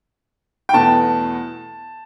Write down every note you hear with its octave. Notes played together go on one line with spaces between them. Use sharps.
G5
E2 B2 A3 A5